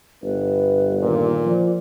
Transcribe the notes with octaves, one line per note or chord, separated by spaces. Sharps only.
G1 B4
A#2 D#3
F3 D5